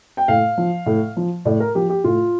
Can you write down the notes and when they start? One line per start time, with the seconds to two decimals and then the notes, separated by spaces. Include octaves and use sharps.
0.17 G5
0.28 A2 F5
0.58 F3
0.86 A2
1.17 F3
1.45 A2 D5
1.60 A#4
1.75 F3 G4
1.89 G4
2.04 A2 F4